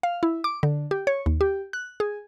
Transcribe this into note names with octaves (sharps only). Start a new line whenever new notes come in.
F5
E4
D6
D3
G4
C#5
D#2
G4
F#6
G#4